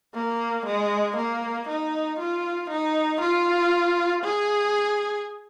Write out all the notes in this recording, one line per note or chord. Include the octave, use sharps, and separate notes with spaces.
A#3
G#3
A#3
D#4
F4
D#4
F4
G#4